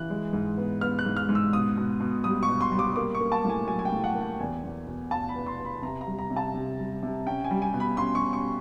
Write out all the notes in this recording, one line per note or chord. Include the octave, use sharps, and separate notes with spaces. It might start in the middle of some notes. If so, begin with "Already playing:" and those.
Already playing: E3 F#6
G#3
G#2
B3
B3 F6
F#6
G#2
F6
G#2
E6
B2 D#6
B2
B2
G3 D#6
C#6
B2
C6
G3
D6
A#3 D6
C#6
A#3
A5
A2 G#5
F#3 G#5
G#5
G5
A2
F#5
A#3
G5
E2 G#5
E2
B2
B2 A5
B5
B3
C6
B3
B5
C3 A#5
A#5
G3
A#5
C3
A5
C3
G3
C3
C#4 G5
G#5
G3
G#5
B2
B5
C#4 C6
C#6
C#4
C#6